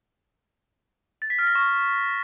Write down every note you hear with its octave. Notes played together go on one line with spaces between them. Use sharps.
A6
B6
F6
A#6
C#6